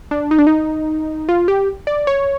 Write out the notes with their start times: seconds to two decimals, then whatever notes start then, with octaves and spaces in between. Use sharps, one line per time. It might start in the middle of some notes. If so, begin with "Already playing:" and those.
0.11 D4
0.31 D#4
0.39 D4
0.47 D#4
1.29 F4
1.48 G4
1.87 D5
2.07 C#5